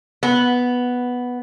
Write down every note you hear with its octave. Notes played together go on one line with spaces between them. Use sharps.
B3